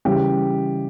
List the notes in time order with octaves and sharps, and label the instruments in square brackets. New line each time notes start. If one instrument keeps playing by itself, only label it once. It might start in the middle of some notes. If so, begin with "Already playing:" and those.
[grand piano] C#3 E3 G3 G4